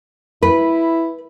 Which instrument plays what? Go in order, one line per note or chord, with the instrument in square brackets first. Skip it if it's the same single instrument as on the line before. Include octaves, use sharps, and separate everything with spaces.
[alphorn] E4 [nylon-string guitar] B4